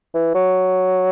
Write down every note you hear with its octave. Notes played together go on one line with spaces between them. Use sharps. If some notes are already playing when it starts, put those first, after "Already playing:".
E3
F#3